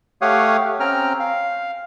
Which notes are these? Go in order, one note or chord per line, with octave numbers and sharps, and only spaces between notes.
A3 G4 C#5 F5 F#5 D#6
C4 C#4 G5 A#5 F6
F5